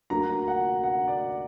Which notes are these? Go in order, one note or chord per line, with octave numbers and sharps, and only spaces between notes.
D2 D3 F#3 A#3 A#5
F#5
F#5
D5